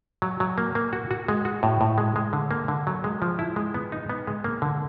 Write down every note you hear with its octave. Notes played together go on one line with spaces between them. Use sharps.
F#3
F#3
A#3
A#3
F#4
F#4
G#3
F#4
A2
A2
G#3
G#3
D3
A#3
D3
F#3
G#3
F3
E4
G#3
B3
D#4
B3
G#3
A#3
D3